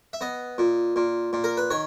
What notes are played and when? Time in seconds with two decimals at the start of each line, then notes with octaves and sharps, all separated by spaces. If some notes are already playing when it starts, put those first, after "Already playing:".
0.13 E5
0.21 B3 D#5
0.58 A#2
0.96 A#2
1.33 A#2
1.44 A#4
1.57 B4
1.70 D#3 C#5